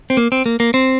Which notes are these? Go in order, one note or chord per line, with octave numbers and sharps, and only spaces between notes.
C4
A#3
C4
A#3
A#3
C4